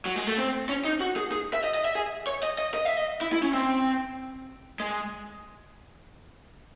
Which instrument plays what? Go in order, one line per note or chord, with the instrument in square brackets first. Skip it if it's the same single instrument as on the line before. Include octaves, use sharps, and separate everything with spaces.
[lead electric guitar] F#3
G#3
A3
C4
C#4
D#4
F#4
G#4
G#4
E5
D#5
D#5
E5
G#4
C#5
D#5
D#5
D#5
E5
D#5
E4
E4
C#4
C4
G#3